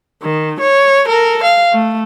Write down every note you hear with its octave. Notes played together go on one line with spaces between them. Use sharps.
D#3
C#5
A4 A#4
F5
A3